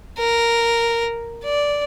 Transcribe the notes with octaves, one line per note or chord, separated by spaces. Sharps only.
A#4
D5